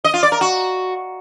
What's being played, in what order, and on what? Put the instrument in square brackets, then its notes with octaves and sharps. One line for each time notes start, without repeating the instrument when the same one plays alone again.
[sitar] D#5
F4
D5
A#4
F#4